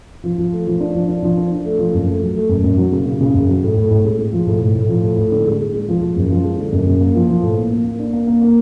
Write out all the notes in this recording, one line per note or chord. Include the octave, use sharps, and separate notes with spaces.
F3
F3
A3
F3
D4
F3
D4
F3
D4
D4
A3
F3
F#2
A3
F#3
A3
F#2
F#2
F#3
C#3
C#3
C#3
F#2
F#3
A2
A2
A2
G#3
G#3
F3
A2
A2
A2
F3
A2
A2
D3
G#3
G#3
G#3
F3
F3
F#2
F3
G#3
D3
F#2
F#2
A#3
F3
F3
A2
A#3
A#3
A#3
D4
A#3
A#3
A#3